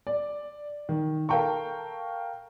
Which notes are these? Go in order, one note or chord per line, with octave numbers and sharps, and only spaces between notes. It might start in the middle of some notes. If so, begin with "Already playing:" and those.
D5
D#3
A4 A#4 F5 G5 A#5 C#6